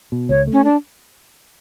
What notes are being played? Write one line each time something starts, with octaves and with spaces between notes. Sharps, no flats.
B2
C#2 C#5
A3
C#4
D4